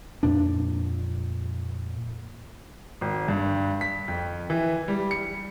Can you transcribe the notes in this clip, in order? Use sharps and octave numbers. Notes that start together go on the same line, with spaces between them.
F2 A#2 D4
G#1
G2
B6
F2
E3
G3
C#7